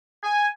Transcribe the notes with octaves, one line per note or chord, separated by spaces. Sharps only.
G#5